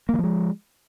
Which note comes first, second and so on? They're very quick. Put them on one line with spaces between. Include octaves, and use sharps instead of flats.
A#3 E3 F3 G#3